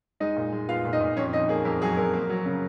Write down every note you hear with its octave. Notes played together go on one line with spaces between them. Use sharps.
G#3 D#4 D#5
A#2
G#3
B3 F4 F5
A#2
D#4 D#5
A#2
F2 C#4 C#5
F2 D#4 D#5
A#3 G#4
F2 A#4
F#3 G#4
F2 A#4
A#3
F#3
C#3